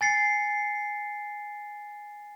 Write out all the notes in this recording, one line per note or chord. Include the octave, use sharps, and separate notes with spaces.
G#5 A6 C7 C#7